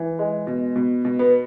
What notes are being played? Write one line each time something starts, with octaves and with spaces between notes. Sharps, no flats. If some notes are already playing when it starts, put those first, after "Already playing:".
Already playing: E3
G#3
B2
B2
B2
B3